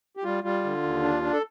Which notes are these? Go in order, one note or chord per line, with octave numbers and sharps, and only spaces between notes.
G4
G3 F4
G3 F4
D3
D#2
D4
D4
A4